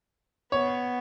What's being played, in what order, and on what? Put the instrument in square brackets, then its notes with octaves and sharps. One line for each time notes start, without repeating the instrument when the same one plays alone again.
[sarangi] B3 [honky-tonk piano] C#5